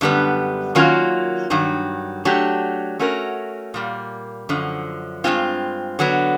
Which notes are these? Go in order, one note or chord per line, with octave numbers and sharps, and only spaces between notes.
F#2 D3 G3 B3
D#3 F#3 A#3 C#4 F4
G2 D#3 F#3
F#3 A3 D4 G4
A3 C#4 F#4 A#4
A#2 G3 A#3
F#2 D3 F3
G2 D#3 G#3 C4 F4
D3 F#3 B3